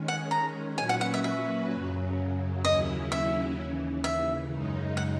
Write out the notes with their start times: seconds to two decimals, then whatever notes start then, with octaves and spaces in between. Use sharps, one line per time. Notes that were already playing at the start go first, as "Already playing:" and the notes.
Already playing: D#3 G#3 C#4
0.08 F#5
0.31 A#5
0.78 A#2 F#3 C#4 F#4 B4 G#5
0.89 F#5
1.01 F#5
1.14 E5
1.24 E5
1.71 F#2 C#3 F#3
2.65 D#2 C#3 F#3 C#4 E4 D#5
3.12 E5
3.57 D#2 C#3 E3
4.04 E5
4.50 F#2 C#3 G#3 D#4
4.97 F#5